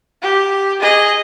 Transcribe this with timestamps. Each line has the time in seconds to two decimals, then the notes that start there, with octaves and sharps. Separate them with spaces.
0.22 G4
0.81 G#4 D#5